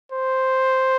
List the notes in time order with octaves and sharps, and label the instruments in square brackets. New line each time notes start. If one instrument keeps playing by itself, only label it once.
[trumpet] C5